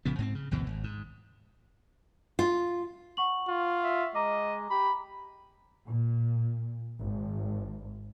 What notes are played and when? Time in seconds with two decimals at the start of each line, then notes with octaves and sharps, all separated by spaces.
0.05 A#1 C#3 F3 B3
0.18 G#2 B3 C4
0.35 C#3
0.51 G#1 D2 B2 E3
0.67 G#1
0.84 G#2
2.39 F4
3.17 F#5 C#6 F#7
3.48 F4
3.83 E5
4.15 G#3 D#5 A#5 D6
4.71 G4 B5
5.86 A#2
7.02 G#1